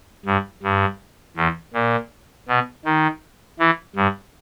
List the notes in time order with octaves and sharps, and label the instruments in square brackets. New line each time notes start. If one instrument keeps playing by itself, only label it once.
[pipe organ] G2
G2
E2
A#2
B2
D#3
E3
G2